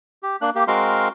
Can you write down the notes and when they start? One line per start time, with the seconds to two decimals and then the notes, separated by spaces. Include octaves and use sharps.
0.23 G4
0.42 A#3 D4 F#6
0.56 A#3 G4
0.68 G#3 C4 F#4 A#4 F5 C6